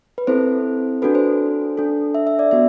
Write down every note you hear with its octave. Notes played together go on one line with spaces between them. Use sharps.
B4
C4 E4 A4 C5
D4 F#4 A4 B4
C5
D4 A4
E5
E5
D5
B3 F#4 E5